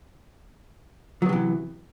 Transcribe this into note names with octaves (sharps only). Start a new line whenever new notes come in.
C3 E3 F#3 B3